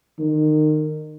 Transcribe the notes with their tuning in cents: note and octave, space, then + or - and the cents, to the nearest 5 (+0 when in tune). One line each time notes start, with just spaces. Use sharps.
D#3 -25